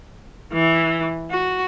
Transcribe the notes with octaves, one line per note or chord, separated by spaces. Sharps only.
E3
F#4